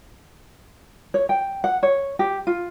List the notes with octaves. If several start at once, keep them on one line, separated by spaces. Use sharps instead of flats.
C#5
G5
F#5
C#5
G4
F4